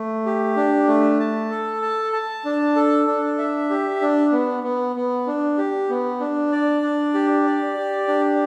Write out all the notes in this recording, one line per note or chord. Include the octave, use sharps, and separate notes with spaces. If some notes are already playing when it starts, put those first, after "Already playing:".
Already playing: A3
G4
D4
A3
A5
A4
A5
A5
D4
A4
D4
E5
G4
D4
B3
B3
B3
D4
G4
B3
D4
D5
D4
G4
D5
G4
D4